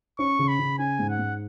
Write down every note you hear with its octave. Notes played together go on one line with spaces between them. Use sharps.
C#4 C#6
C#3
B5
C#3
C#4 G#5
G#2
F#5
G#2